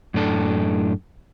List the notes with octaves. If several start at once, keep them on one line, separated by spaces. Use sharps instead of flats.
F#2 A2 D4 A4